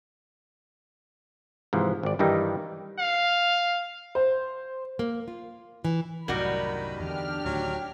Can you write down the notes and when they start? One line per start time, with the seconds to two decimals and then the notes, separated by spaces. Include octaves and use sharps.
1.73 G#2 C3 E3 F3
2.03 G#1 D5
2.19 G2 D#3 E3 G3 D#4
2.99 F5
4.15 C5
4.99 A#3
5.28 F4
5.85 E3
6.28 C2 F#2 A2 D#3 G3 F#4 A#4 B5
7.00 E2 D3 D4 G4 F6
7.45 D2 A2 D#3 F#3